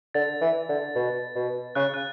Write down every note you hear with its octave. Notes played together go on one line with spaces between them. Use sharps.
D3 A6
E3
D3
B2
B2
C#3 F#6
F#6